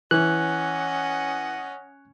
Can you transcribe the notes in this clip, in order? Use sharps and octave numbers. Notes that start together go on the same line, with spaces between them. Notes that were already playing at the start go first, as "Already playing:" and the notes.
E3 C#4 D#5 F#5 F#6